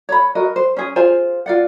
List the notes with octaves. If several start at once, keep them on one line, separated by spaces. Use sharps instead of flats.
C#5 B5
F#4 A#4 D#5
C5
C#4 G#4
F4 G#4 C5 G#5
F4 D5 F#5